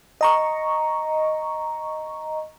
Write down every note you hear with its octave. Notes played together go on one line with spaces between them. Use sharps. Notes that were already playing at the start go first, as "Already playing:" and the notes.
D#5 A#5 C#6